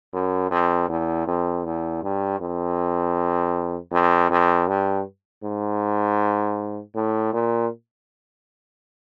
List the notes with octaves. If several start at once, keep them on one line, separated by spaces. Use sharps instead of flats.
F#2
F2
E2
F2
E2
G2
F2
F2
F2
G2
G#2
A2
A#2